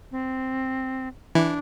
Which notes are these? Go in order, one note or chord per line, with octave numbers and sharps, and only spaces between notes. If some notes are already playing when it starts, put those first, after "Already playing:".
C4
E3 D4 E4